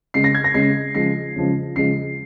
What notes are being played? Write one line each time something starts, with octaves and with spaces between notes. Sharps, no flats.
C#3 G#3 C7
A#6
G#6
A#6
C#3 G#3 C7
C#3 F3 G#3 C7
C#3 F3 G#3
C#3 F3 G#3 C7